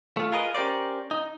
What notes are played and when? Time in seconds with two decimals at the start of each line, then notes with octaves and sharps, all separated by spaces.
0.17 A3 F4
0.32 F4 G#4 A#4 B4 D#5
0.55 C#4 G4 A#4 C5 D5
1.11 D#4